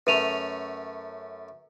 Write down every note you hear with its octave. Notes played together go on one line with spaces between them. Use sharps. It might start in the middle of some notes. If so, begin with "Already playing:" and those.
F#2 A3 C#4 B4 D#7 F7